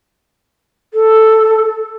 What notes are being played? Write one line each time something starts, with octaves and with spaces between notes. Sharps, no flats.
A4